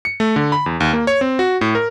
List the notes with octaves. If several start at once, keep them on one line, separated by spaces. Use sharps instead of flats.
C#7
A3
D3
B5
E2
D#2
A#3
C#5
C4
F#4
A2
A#4